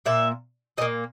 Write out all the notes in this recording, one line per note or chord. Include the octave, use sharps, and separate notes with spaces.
A#2 A#3 E5
A#2 A#3 D#5